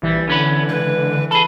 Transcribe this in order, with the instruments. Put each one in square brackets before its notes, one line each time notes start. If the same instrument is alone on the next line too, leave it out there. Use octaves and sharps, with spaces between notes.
[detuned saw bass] A#1 [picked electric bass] E3 [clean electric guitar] G3
[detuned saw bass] D3 [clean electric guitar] B3 C#4 B4
[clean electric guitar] C#2 [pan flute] B4
[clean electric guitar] G#4 A4 [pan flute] B5